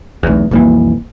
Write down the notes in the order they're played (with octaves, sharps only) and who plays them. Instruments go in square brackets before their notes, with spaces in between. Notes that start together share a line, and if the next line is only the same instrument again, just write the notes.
[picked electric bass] B1 E2 [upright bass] A3 C4
[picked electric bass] B1 F2 E3 [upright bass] G3 A#3